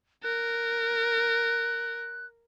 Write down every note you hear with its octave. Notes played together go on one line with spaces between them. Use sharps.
A#4 F#6